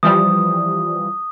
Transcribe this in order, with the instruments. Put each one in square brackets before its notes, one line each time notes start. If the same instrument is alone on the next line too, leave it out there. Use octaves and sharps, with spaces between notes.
[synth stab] E3 F3 G3 [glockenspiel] D#6